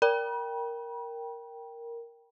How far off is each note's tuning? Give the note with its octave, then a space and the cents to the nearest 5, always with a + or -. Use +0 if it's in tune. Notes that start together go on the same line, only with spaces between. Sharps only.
A#4 +0 G5 +0 B5 -40